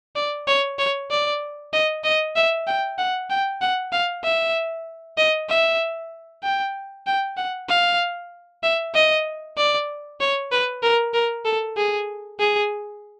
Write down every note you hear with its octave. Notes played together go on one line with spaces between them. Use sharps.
D5
C#5
C#5
D5
D#5
D#5
E5
G5
F#5
G5
F#5
F5
E5
D#5
E5
G5
G5
F#5
F5
E5
D#5
D5
C#5
B4
A#4
A#4
A4
G#4
G#4